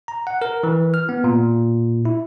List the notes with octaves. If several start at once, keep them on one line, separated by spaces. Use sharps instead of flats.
A#5
F#5
A#4
E3
F6
B3
A#2
E4